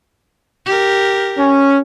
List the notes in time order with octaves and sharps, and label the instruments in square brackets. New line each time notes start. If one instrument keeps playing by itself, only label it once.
[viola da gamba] G4 A#4
[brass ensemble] C#4